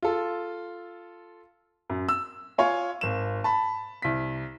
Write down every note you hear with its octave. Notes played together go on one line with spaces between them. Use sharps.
F4 A4
F#2
E6
F4 C#5 G#5
G#1 E7
A5 B5
C2 B6